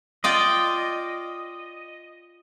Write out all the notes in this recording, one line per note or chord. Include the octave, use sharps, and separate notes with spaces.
F4 D5 D#5 G5